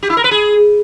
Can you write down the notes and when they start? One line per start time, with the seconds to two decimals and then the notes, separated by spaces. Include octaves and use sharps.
0.03 G4
0.10 E4
0.17 A#4
0.24 B4
0.31 G#4